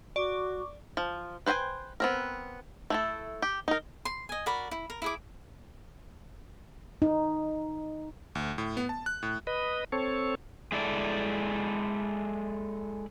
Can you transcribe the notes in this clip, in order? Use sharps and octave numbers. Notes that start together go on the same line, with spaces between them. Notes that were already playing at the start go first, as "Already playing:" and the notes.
F#4 D5 C#6 D6
F3
B4 C5 E5 G5 G#5
B3 C4 A#4
A3 E4 A4
G4
D#4 A#4
C6
D#5 G#5
F#4 A#4 D5 B5
E4
A#4
E4 G#4 D6
D#4
D2
A2
B3
A5
F#6
A2
B4 D#5
C4 A4 C#5
G#3 E4 A4 D5